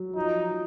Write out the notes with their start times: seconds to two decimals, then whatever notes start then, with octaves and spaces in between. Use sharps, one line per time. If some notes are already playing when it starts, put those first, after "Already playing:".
Already playing: F#3
0.16 F3 D#4
0.51 F3